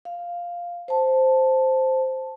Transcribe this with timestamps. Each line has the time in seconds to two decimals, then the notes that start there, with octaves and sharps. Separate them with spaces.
0.05 F5
0.88 C5 A5